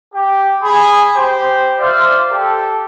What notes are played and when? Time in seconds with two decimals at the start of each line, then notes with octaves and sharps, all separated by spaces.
0.14 G4
0.63 G#4 B5
1.16 G4 C5
1.79 F4 C5 D5 E5 F5
2.31 G4 A4